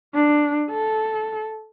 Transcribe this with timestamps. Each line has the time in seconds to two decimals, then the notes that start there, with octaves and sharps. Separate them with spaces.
0.15 D4
0.70 A4